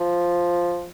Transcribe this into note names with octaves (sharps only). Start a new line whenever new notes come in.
F3